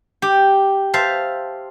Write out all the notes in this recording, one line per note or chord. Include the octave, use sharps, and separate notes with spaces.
G4
C5 E5 F5 A5